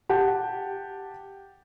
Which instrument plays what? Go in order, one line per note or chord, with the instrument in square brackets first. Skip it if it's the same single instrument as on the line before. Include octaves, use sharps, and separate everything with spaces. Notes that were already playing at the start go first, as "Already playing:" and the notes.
[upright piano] G4 F#5 A5